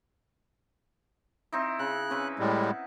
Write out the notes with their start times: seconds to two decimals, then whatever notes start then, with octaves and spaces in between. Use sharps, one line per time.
1.53 C4 D#4 E4
1.79 C#3 F#6
2.10 C4 C#4 B4
2.39 A2 G3 G#3
2.63 F#5